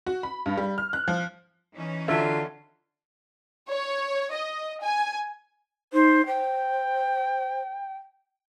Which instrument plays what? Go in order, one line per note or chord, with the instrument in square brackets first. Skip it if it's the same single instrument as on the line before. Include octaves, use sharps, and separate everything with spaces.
[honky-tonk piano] F#4
B5
G2
G3
F6
F#6
F3
[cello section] E3 C#4 D#4
[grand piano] D3 [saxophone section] F#3 F4 [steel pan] E5
[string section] C#5
D#5
G#5
[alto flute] D#4 [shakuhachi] C5
[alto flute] C5 [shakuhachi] G5